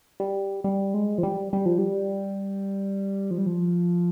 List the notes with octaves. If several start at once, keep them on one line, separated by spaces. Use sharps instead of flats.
G3
G3
G#3
F3
G3
G3
F3
G3
F3
G3
F3